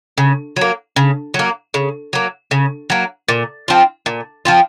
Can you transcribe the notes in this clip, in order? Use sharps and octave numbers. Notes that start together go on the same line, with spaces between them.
C#3
F#3 A#3
C#3
F#3 A#3
C#3
F#3 A#3
C#3
F#3 A#3
A#2
F3 C4 F4
A#2
F3 C4 F4